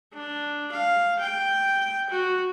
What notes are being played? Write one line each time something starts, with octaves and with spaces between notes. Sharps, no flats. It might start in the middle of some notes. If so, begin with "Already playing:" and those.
D4
F5
G5
F#4